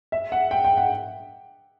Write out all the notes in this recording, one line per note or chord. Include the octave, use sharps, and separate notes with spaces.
E5
F#5
G5
G5
F#5